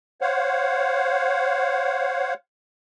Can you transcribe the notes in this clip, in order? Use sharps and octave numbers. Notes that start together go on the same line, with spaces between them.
C5 C#5 F5 F#5